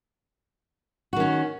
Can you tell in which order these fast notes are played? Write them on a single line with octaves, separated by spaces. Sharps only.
F#4 D#3 C#4